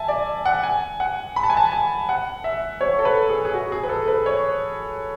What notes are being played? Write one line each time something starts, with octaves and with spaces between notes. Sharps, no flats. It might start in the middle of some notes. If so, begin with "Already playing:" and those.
Already playing: E5 G#5 A5
D5
F#5
G#5
F#5
B5
A5
G#5
A5
G#5
F#5
E5
C#5
A4
B4
G#4
G#4
F#4
G#4
B4
A4
B4
C#5